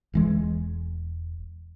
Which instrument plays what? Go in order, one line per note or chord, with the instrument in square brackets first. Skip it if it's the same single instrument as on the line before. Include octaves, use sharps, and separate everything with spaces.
[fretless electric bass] E1 E3 G#3